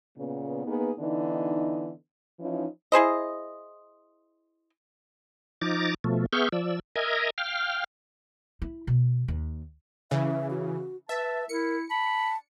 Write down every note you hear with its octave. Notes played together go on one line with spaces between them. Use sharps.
A#2 C#3 B3
A#3 B3 D#4 G#4 B4
D3 E3 B3 D#4
E3 F3 C#4 D#4
E4 G#4 C5 D#5
F3 D#4 A#5 D6 A6
B2 F3 A3
B3 G#4 E5 C#6 F6 G6
F3 D5 E6
A#4 D#5 E5 G#5 A#5
F5 G5 F6
E4
B2
D#2
C#3 E3 E5
F#4
B4 E5 A5
E4 A#4 C#7
A5 B5